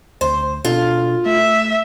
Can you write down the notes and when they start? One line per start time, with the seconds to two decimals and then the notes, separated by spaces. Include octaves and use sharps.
0.21 D2 C5
0.65 B2 D4 F4 A4
1.26 A3 E5